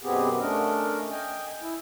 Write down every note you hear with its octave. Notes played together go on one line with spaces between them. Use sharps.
F#2 B2 B3 C4 G4 G#4
A3 C#4 D4 A#4 D#5
D#5 G5 G#5
E4